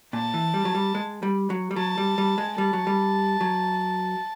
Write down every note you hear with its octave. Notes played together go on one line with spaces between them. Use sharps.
A#2 A5
E3
G3
F#3
G3
G#3
G3
F#3
G3
F#3 A5
G3
G3
G#3
G3 A5
F#3
G3
F#3